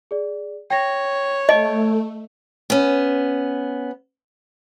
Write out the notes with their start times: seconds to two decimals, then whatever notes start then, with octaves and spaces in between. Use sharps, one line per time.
0.11 G#4 D5
0.70 C#5 G5 A#6
1.49 A3 D#5 A5 D7
2.70 B3 C#4